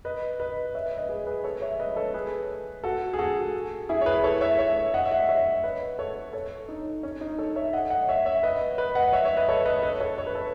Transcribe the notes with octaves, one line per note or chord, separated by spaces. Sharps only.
B4 D#5
B4 D#5
C#5 E5
B4 D#5
B4 D#5
G#4 B4
G#4 B4
A4 C#5
C#5 E5
B4 D#5
A4 C#5
G#4 B4
F#4 A4
G#4
F#4 A4
E4 G#4
C#5
G#4 B4
A4 C#5
C#5 E5
C#5 E5
D#5 F#5
E5
D#5 F#5
C#5 E5
B4 D#5
A4 C#5
A4 C#5
D#4
C#4
D#4
A4 C#5
C#5 E5
D#5 F#5
D#5 F#5
C#5 E5
C#5 E5
B4 D#5
B4 D#5
D#5 F#5
C#5 E5
C#5 E5
B4 D#5
A4 C#5
B4 D#5
B4 D#5
A4 C#5
C#5
B4
A4